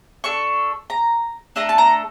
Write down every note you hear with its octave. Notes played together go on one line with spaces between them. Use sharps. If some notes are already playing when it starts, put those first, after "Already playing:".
D4 A4 C#6
A#5
A3 D4 A4 A#5
A5
A#5